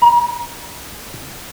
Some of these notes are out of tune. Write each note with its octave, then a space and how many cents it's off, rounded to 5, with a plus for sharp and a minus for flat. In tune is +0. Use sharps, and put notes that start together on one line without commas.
A#5 +30